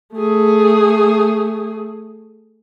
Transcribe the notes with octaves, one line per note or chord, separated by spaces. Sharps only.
A3 G#4